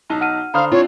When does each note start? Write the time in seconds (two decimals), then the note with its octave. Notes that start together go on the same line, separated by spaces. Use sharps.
0.10 B1 D#4 A5
0.21 F#5 F6 D#7
0.54 D3 C5 F5 A#5 B5 D#6 F6
0.72 C4 D4 E4 F4 C#5